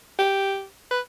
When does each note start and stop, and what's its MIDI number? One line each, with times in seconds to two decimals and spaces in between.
0.19 0.64 67
0.91 1.00 71